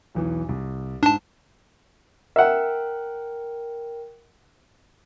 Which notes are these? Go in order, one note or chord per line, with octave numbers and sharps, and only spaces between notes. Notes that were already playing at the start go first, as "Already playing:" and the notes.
B1 E2 E3
C2
G#2 D4 A5
A#4 E5 F#5 G5